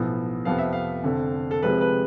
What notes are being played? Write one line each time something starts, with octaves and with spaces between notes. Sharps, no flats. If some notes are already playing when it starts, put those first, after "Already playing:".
Already playing: B1 A2 F3 B3
F2 C3 F3 B3 F5
E5
F5
F1 F2 D3
A4
F1 F2 C3 F3 G#3 B4
B4